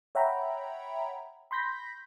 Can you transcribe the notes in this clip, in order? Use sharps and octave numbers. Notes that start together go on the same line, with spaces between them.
C#5 E5 F#5 G5 A#5 B5
B5 C6 G6 A#6 B6